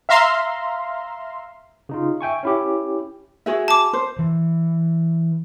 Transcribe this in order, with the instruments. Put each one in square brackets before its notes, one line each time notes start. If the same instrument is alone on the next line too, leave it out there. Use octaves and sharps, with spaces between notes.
[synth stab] E5 F5 A#5 C6
[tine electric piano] C#3 D#4 F4
E5 G5 G#5 C#6
C#4 E4 G4
[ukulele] F#4 G#4 E5
[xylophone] A5 D6
[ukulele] C5
[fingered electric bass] E3